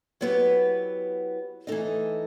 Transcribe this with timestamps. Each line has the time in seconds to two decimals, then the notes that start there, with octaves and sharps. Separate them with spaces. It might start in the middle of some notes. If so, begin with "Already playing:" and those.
0.21 F#3 B3 E4 G4 B4
1.67 E3 A3 D#4 A4 D#5